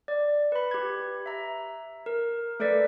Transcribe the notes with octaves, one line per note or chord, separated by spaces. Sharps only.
D5
B4 B5
G4 G#6
E5 A#5
A#4
A3 A4 B4 D5 B6